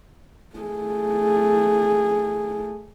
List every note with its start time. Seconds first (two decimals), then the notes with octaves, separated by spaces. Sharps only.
0.56 A3 G#4